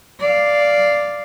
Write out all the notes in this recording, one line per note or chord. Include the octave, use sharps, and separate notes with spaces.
D5 F5